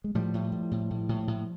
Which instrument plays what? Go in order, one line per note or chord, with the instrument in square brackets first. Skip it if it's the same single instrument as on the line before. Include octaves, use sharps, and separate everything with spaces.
[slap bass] G#3
A2 F3 G3
A2
A2
A2
A2
A2
A2